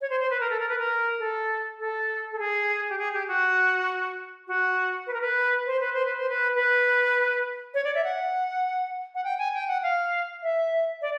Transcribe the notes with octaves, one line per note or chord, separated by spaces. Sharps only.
C#5
C5
C5
B4
A#4
A4
A#4
B4
A#4
A4
A4
A4
G#4
G4
G#4
G4
F#4
F#4
B4
A#4
B4
C5
B4
C5
B4
C5
B4
B4
C#5
D5
E5
F#5
F#5
G5
G#5
G5
F#5
F5
E5
D5